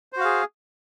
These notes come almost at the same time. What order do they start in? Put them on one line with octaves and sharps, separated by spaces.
C5 F#4 F5 G#4